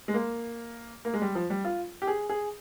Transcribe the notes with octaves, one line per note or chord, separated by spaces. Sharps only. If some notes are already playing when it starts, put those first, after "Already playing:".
G#3
A#3
A#3
G#3
G3
F3
G3
F4
G4
G#4
G#4